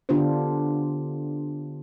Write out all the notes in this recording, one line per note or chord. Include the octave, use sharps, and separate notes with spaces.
D3 B3 D4 F4 G4 C5